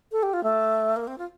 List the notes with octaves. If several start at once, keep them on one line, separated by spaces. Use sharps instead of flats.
A4
G4
F4
A3
A#3
C4
F4